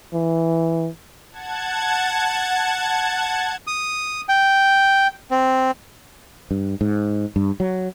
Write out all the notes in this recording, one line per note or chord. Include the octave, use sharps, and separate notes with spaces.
E3
F#5 A5 G#6
D#6
G5
C4
G2
G#2
G2
F#3